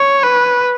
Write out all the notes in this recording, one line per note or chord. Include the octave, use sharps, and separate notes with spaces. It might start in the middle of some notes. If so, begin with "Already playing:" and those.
Already playing: C#5
B4